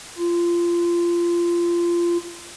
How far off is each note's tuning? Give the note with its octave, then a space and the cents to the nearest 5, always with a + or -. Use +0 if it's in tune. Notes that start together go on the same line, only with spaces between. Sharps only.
F4 -20